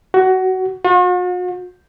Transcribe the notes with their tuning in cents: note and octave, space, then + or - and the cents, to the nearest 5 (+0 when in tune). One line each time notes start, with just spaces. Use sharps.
F#4 +20
F#4 -45